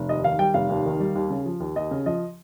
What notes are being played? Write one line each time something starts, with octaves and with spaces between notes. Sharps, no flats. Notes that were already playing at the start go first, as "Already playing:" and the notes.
Already playing: F1
D#2 D#5
D#3 F5
G3 G5
F1 F5
D#2
D#3
G3
D#2
C#3
F3
D#2
D#2 D#5
C#3
F3 D#5